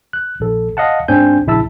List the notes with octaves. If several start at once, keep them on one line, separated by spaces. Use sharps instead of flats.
F#6
A#1 A4
D#5 F5 F#5 A5
G#2 C4 D4 G#5 G6
A#1 C#3 E4 E5 A5 E6